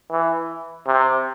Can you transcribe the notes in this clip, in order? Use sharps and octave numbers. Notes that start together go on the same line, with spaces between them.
E3
C3